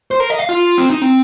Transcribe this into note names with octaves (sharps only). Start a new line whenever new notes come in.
C5
A#4
D#5
F5
F4
C4
D#4
C4